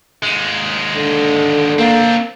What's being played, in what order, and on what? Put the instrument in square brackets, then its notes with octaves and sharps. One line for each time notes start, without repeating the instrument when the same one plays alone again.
[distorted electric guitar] D#2 G#3
[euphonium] D3
[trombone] A#3 [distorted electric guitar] C4 D4